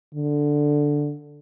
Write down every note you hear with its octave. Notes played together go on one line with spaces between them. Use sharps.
D3